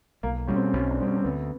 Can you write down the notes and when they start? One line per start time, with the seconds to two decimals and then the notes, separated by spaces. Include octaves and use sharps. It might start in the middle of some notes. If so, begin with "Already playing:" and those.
0.23 B1 A#3
0.47 B2 G3 C#4
0.56 C4
0.73 B1 C#4
0.91 D4
0.99 B2 G3 C4
1.07 C#4
1.17 C4
1.24 D2 B3